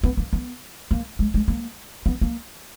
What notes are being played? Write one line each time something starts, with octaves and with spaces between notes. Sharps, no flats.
B3
A#3
B3
A#3
G#3
G#3
A#3
B3
A#3